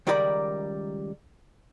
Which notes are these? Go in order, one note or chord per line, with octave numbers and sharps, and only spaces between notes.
C#2 D#3 G3 A#4 D5 B5